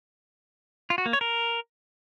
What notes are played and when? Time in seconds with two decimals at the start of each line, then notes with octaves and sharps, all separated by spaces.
0.90 F4
0.98 F#4
1.06 A#3
1.13 C#5
1.21 A#4